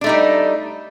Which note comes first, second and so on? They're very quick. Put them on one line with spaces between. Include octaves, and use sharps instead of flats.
D4 A3 D#4 G3